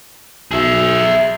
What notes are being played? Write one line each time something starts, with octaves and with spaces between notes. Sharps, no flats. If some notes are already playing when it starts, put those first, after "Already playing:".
B1 G#4 E5